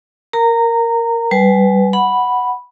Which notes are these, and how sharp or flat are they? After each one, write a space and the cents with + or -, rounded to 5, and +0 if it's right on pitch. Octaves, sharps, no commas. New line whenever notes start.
A#4 +0 A#5 -20
G3 -15 B4 +10 G#5 +25
F#5 +0 B5 -5